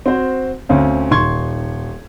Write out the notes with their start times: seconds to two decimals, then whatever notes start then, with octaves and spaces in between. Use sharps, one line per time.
0.06 C4 F#4 C5
0.69 D2 C4 C#4 F5
1.11 D#1 C6 C#6 G#6